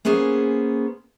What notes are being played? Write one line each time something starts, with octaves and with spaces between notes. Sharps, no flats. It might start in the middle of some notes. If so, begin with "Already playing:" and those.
A#3 B3 C#4 G#4 C5